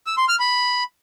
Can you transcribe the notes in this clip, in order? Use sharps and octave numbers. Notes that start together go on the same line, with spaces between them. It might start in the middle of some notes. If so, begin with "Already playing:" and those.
E6
C6
F6
B5